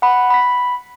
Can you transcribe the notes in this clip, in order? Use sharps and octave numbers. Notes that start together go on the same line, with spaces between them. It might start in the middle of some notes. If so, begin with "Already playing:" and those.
F#5 B5
B5 B6